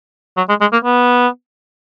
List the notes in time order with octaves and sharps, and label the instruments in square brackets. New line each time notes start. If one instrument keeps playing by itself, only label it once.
[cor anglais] F#3
G#3
G#3
A#3
B3